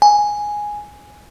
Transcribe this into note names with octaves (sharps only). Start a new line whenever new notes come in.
G#5